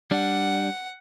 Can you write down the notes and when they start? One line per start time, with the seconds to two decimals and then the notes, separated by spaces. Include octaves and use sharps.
0.11 G3 D4 F#5